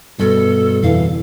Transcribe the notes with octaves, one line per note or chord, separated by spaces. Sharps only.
G2 B2 A4
F2 B2 D3 E3 F5